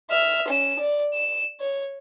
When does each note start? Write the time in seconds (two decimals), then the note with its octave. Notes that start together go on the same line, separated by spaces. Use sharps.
0.10 E5 F6
0.48 C#4 E7
0.79 D5
1.14 E7
1.60 C#5